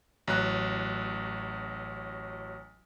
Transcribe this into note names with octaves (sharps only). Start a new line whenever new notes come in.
A1 F#3 F#6